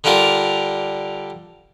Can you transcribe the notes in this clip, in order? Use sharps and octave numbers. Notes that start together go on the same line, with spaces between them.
D3 G3 D4 F4 A#4